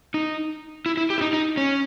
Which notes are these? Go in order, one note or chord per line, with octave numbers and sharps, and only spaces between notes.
D#4
E4
E4
G4
E4
D#4
D#4
C#4